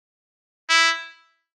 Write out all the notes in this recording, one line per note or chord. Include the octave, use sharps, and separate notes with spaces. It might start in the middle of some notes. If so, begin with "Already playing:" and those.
E4